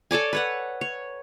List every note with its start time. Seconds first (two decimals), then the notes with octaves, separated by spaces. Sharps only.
0.11 A4 C#5 D5 G#5
0.33 B4 C#5 F#5
0.81 C#5